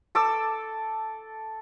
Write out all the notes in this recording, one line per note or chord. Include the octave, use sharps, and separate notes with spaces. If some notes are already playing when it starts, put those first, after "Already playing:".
A4 D6 E6